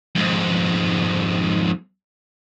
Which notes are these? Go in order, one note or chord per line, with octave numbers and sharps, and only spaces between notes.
F2 G#2